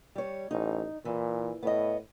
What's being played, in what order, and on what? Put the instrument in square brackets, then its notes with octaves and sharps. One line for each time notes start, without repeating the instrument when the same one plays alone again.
[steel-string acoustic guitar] G3 C#5
[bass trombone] A1 [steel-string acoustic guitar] D#4
[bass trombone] A#2 [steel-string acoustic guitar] E3
[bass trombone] A2 [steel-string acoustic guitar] B3 D#5